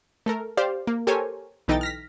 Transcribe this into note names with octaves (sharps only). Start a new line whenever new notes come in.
A3 A4 A#4
G4 C5 D5 F5
A#3
G4 A4 A#4 C5 C#5 G#5
B1 E3 D#4 A4 G5 A6
F6 A#6 B6